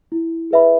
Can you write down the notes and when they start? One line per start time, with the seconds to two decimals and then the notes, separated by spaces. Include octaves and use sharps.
0.12 E4
0.51 G#4 B4 E5 B5